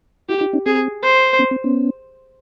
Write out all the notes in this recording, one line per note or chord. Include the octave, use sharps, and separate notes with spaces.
E4 F#4 G4
D#4 F4
C#4 D#4
C4 G#4
C5
B3 C#4
C4
B3 C#4